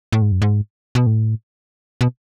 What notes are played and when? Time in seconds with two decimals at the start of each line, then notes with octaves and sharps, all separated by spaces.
0.12 A2
0.22 G#2
0.32 F#2
0.42 G#2
0.95 B2
1.07 A2
2.01 B2